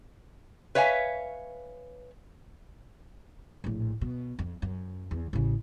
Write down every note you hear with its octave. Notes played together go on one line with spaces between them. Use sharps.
B4 C#5 E5 F5 G#5
A#1 A2
B2
F2
F#2
E2
A1 C#3